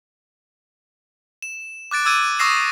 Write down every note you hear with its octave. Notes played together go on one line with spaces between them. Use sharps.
E7
D6 F#6 A6 D7
D6 E6 G#6 D#7
C#6 D#6 E6 A#6 C7 E7